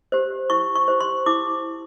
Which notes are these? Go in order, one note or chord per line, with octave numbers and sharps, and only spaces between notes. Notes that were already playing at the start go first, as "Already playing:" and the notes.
G4 C5
E4 C#6
C#6
G4 C5
C6
E4 D6